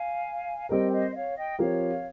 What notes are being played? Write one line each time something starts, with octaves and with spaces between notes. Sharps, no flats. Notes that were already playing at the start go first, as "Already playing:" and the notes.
Already playing: F5 G#5
G3 C4 G4 A#4 D#5 G5
C5 D#5
D#5
C#5 F5
D#5 G5
F3 C4 G4 A#4 C#5 F5